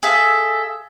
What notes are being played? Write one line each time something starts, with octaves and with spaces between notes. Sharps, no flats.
G#4 A4 E5 F5